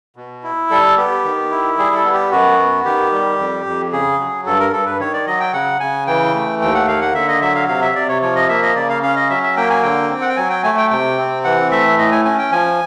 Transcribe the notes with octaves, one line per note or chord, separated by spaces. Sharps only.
B2
E4
G3 A4
B3 G4
D#3
E4
G3 G#4
A4
B3
G4
F#2 F#4
B3
D#3 G4
G3
F2
F2
C#3 G#4
F#3
G2 A4
A#4
G2 A4
B4
D#3 C#5
D5
F#3 D#5
G5
C#3 F#5
C#3 G#5
E3 G5
A3
D#2 G5
F#5
A#3 F5
F#5
D3 E5
D#5
F#3 E5
F5
C3 F5
E5
C3 D5
C#5
F3 C#5
D#5
A#3 E5
D#5
C#3 D5
F5
C#4 F5
D#5
F#3 E5
E5
A#3 G5
G#5
D3 G5
C4
F#5
G5
F#3 G#5
G5
A3 G#5
G5
C3 G5
C4
E3 F#5
A3 E5
A2 D#5
G#5
C#4 G#5
G5
F3 G#5